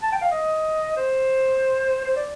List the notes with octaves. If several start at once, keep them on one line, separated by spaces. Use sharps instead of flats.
A5
G5
F5
D#5
C5
C5
D5